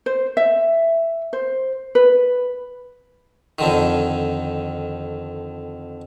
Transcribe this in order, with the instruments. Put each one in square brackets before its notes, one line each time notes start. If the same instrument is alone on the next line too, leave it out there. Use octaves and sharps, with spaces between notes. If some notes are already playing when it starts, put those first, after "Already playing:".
[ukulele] C5
E5
C5
B4
[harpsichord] F2 D3 D#3